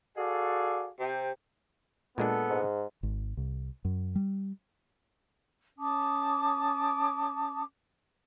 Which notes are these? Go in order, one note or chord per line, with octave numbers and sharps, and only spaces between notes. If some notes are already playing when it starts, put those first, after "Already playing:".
F#4 G#4 A4 D5 F5
C3 G5
A#2 G#3 B3 D4 A4
G#2
G#1
C2
F#2
G3
C#4 A5 D6 D#6